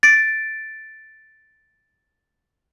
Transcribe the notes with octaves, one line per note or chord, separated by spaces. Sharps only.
A6 D7